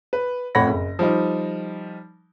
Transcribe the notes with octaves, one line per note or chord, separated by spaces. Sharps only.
B4
F2 A2 C#5 F#5 B5 A#6
F#1
F3 G3 D#4